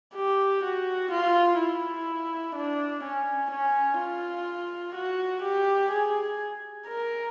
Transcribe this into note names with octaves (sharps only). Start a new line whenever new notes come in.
G4
F#4
F4
E4
D4
C#4
C#4
F4
F#4
G4
G#4
A#4